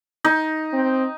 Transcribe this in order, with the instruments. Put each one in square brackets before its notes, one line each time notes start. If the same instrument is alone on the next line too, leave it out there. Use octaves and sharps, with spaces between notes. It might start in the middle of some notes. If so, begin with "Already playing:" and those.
[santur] D#4
[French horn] C4